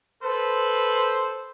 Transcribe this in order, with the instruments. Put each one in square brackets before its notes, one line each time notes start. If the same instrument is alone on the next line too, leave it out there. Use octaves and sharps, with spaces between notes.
[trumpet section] A4 B4 [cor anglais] C5